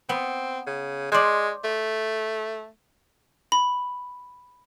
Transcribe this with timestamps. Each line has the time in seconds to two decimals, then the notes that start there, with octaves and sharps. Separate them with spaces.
0.09 B3 C4
0.67 C#3
1.12 G#3 C5 D5
1.64 A3
3.52 B5